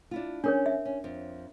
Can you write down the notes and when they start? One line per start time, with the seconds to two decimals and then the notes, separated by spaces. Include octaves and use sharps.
0.11 D4 E4 F4
0.44 C#4 D4 A#4 C#5
0.66 E5
0.85 C#4
1.04 F2